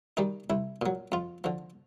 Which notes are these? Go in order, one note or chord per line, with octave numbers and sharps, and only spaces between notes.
D#3 G3 D#4
C2 E4
A#2 F#3
F2 F4
D3 F3